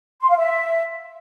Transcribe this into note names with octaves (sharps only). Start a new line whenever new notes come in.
C6
F5
E5